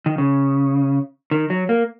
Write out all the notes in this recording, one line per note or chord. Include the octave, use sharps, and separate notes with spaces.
D#3
C#3
D#3
F#3
A#3